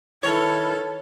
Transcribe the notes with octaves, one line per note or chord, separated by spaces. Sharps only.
D#3 E4 A4 B4 C#5 F6